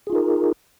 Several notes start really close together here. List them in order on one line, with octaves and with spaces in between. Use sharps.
G#4 F4 D#4 A#4